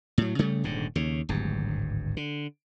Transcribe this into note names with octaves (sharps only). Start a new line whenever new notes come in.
A2 F#3
C#3 G3 A3
D#1 G#2 D3
D#2 C#3
D1 G#1 G2
D3